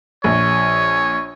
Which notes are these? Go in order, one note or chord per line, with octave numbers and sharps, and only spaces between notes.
A#1 C#5